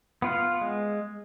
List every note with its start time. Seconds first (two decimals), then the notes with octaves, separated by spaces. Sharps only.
0.22 B3 F4 B4 F5
0.61 G#3